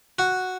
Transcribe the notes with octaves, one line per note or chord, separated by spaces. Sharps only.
F#4